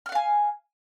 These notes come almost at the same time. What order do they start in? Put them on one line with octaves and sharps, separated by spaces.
F6 F#5 F5 G#5